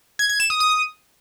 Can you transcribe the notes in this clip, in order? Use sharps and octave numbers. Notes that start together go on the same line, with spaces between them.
G#6
G#6
E7
D#6
D#6